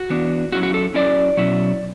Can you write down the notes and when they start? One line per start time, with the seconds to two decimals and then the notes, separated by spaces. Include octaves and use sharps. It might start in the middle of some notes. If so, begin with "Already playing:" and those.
Already playing: F#4
0.10 E3 B3 D4
0.52 F#3 C#4 E4 F#4
0.63 F#4
0.74 A4
0.94 F#3 C#4 E4 D5
1.37 B2 F#3 C#4 E4